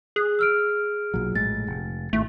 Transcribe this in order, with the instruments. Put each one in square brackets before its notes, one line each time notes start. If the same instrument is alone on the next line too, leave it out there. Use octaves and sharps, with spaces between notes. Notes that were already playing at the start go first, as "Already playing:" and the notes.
[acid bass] G#4 [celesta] F#6
[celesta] E6 F6 D7
[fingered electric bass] B1 A#2 F#3
[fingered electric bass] A#1 A2 G#3 [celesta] A6
[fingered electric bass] F1
[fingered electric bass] G#1 A2 [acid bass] A3